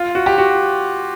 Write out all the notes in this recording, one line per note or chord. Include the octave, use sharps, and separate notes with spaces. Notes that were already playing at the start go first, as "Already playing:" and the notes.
Already playing: F4
F#4
G4
F#4